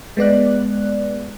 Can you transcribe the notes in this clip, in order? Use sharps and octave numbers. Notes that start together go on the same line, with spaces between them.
G#3 B3 D5 F#6